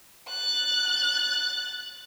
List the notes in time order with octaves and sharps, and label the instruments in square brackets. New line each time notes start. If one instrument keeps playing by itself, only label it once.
[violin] F#6 A6